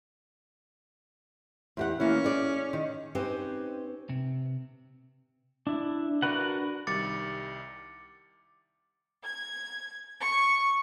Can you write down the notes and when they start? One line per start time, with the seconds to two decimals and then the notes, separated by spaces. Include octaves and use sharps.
1.77 E2 G4 F#5
2.00 E3 A#3 C#4
2.24 G#4 D5
2.73 D#3
3.15 C4 C#4 D#4 G4 B4 C5
4.09 C3
5.67 D4 E4
6.22 D4 F#4 A#4 B4 F#5
6.87 C2 D#3 G3 D6 A6 C#7
9.24 G#6
10.21 C#6